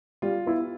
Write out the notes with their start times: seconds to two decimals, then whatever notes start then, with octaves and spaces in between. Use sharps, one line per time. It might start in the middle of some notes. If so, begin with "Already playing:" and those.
0.22 G3 F4
0.46 B3 E4